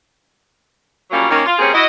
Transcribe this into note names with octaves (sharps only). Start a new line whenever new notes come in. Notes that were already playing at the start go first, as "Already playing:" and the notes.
F#2 A#2 F#3 G3 A#3 C#4
D#3 A#3 C#4
F4
G3 A#3 C4 C#4 G#4
E4 F#4 D#5